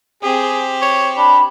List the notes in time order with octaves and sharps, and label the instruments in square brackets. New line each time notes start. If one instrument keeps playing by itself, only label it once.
[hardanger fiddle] C4 G4 [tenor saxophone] G#4
[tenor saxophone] C#5
[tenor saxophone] D4 [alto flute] B5